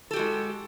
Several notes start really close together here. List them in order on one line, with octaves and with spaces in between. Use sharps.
A4 G4 F#4 G#3